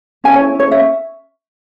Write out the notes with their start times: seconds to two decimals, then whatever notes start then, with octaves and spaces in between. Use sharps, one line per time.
0.24 C#4 G#5
0.35 C#5
0.40 E4
0.55 C#4 C#5
0.71 C#4 E5